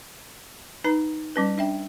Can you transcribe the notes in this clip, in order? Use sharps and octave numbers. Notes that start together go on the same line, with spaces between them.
D#4 B4 A#5
G3 C#4 B4
D4 E5 G5